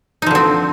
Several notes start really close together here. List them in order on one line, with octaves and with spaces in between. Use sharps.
D#4 F3 D3 C4